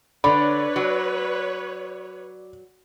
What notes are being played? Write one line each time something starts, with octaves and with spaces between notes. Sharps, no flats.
D3 B4 C#5 D5 B5
F#3